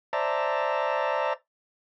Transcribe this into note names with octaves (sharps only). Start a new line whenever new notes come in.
C5 D5 E5 A5 A#5